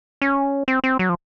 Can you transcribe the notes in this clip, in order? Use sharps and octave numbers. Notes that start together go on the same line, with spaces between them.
C#4
C4
C4
F#3
F3